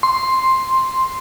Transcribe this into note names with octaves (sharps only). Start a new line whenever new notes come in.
C6